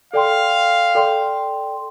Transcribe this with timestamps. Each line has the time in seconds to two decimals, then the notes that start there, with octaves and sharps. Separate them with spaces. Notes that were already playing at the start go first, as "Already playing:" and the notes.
0.13 A4 D5 F5 G5 C6
0.95 A4 D5 G5 C6